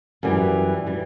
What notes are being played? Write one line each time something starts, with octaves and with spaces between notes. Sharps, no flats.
F#2 E3 G3
E3 G3